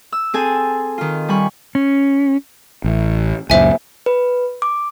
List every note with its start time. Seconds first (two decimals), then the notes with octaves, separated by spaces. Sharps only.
0.12 E6
0.34 C4 G#4 A4 G#5
0.98 D#3 F4
1.28 G3 G#5 B5 C#6
1.75 C#4
2.84 A1
3.50 C#2 F#2 A#2 C5 E5 G#5
4.06 B4
4.62 D6